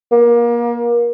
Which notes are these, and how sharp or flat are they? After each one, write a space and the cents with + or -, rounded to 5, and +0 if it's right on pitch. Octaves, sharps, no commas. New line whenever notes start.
A#3 +30